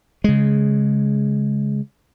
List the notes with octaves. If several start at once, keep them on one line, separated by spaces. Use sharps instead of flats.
C#3 G#3